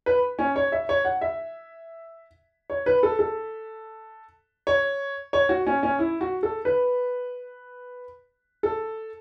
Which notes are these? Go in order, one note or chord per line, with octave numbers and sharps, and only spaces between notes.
B4
C#4
C#5
E5
C#5
F#5
E5
C#5
B4
A4
A4
C#5
C#5
F#4
C#4
C#4
E4
F#4
A4
B4
A4